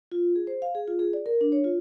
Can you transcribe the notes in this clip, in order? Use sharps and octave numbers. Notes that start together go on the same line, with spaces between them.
F4
G#4
C5
F5
G#4
F4
G#4
D5
A#4
D4
C#5
F4